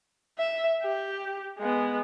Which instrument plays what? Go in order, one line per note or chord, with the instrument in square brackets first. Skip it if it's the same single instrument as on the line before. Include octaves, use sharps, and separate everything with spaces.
[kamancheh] E5
G4
G#3 B3